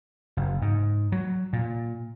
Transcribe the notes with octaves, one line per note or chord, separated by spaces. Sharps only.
F#1
G#2
F#3
A#2